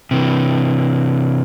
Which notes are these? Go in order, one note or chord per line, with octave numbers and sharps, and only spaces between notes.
C3 E3